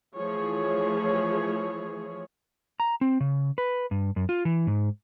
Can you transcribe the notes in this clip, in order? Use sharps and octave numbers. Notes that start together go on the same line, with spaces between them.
E3 F3 A3 G#4 C#5
A#5
C4
C#3
B4
G2
F#2
F4
E3
G#2